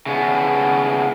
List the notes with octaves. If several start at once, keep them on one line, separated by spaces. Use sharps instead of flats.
C#3 B3